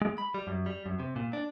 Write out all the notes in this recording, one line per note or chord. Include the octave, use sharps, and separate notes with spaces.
G#3
B5
G3
F#2
G3
F#2
C3
A#2
D4